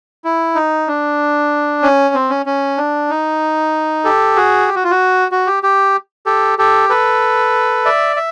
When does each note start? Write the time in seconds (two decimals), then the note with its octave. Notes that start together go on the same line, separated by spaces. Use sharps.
0.24 E4
0.55 D#4
0.88 D4
1.82 C#4
2.14 C4
2.30 C#4
2.46 C#4
2.77 D4
3.10 D#4
4.04 G4 A4
4.36 F#4 G#4
4.68 G4
4.76 F#4
4.84 F4
4.91 F#4
5.32 F#4
5.47 G4
5.63 G4
6.26 G4 A4
6.58 G4 A4
6.89 A4 B4
7.85 D5 E5
8.16 E5